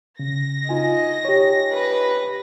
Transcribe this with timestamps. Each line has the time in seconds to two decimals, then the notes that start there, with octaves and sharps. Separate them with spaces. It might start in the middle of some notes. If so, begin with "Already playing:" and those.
0.19 C#3 A#6
0.69 D#4 F4 D#5 G#5
1.25 G4 C#5
1.73 B4